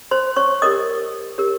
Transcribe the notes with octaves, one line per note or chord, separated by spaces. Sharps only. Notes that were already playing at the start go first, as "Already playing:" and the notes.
C5 C6
C#5 C#6
G4 A#4 C#5 D#5 D#6
G4 A#4 C#5